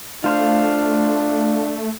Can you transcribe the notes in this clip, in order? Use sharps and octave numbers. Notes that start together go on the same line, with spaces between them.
A3 D4 F4 C5 F5